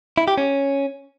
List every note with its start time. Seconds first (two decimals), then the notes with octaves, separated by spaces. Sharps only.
0.18 E4
0.28 G4
0.38 C#4